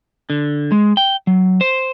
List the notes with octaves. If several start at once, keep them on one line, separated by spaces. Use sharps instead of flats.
D3
G#3
G5
F#3
C5